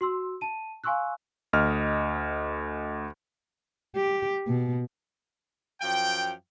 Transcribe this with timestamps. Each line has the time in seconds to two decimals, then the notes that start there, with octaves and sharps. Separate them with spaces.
0.01 F#4 C6 E6
0.41 A5 D#7
0.84 F5 G#5 C6 C#6 E6 F#6
1.53 D2 D#5 F6
3.96 G4
4.47 B2
5.81 F#2 F3 F5 G5